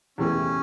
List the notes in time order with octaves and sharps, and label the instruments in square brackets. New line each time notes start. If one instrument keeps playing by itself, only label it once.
[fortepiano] E2 C3 E3 A3 [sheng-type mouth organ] C#4